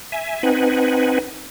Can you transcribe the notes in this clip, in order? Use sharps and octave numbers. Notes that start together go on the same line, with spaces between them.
E5 G#5
C4 D#4 B4 F#5 G#5